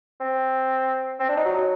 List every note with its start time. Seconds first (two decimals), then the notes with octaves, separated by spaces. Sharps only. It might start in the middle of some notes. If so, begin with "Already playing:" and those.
0.20 C4
1.19 C4
1.29 D4
1.37 D#4
1.45 F#3